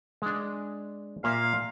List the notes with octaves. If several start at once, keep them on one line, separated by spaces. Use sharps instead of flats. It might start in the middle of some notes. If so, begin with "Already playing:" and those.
G#3 D4
A#2 A#3 E5 F5